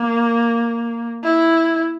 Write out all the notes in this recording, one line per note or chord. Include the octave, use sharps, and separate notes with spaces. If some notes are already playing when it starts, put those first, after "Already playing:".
Already playing: A#3
E4